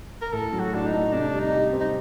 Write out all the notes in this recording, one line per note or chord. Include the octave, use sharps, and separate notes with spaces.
A#4
A2 A4
F#3
F#4
A2 D4
D#4
A3
C3 D4
G3
D#4
G4
C4
D#4